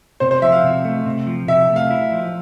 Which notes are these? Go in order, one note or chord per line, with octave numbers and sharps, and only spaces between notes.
C3 C5
C5
F3 E5
F5
C3
A3
C3
F3
C3 E5
A3
F5
E4
F3